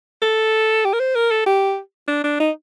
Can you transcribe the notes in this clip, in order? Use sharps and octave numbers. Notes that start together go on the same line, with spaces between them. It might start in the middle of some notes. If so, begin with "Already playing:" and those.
A4
G4
A#4
C5
A#4
A4
G4
D4
D4
D#4